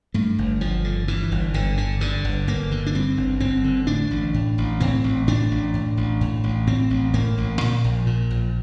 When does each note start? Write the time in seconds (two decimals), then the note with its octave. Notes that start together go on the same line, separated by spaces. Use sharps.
0.14 G2 A3
0.38 G1
0.61 G1 F3
0.84 D3
1.08 G2 E3
1.32 G1
1.54 G1 D3
1.77 D3
2.00 G2 D3
2.25 G1
2.48 G1 A#3
2.71 D3
2.86 D4
2.95 G2 C4
3.17 G1
3.40 G1 C4
3.64 D3
3.87 A2 D4
4.11 A1
4.34 A2
4.58 A1
4.80 A2 C4
5.04 A1
5.27 A2 D4
5.51 A1
5.74 A2
5.97 A1
6.21 A2
6.44 A1
6.67 A2 C4
6.90 A1
7.14 A2 A#3
7.38 A1
7.61 A#2
7.84 A#1
8.07 A#2
8.30 A#1